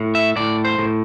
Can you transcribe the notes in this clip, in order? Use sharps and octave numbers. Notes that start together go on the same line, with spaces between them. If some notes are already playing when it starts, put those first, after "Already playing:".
Already playing: A2
E5
A2 D5
C5
A2